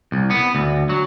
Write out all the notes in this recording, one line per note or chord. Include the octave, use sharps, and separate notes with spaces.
C2
B3
D2
F#3